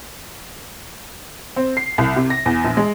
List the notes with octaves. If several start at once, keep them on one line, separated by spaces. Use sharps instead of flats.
C4
C7
C2
C3
A#6
E2
A#1
G#3